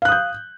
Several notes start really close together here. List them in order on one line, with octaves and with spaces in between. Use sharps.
F5 F#6 D#6 G6